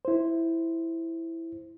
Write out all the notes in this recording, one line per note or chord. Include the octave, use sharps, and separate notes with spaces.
E4 C5